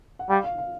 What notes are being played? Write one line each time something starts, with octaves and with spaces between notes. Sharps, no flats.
F#5
G3 F5
F5
F5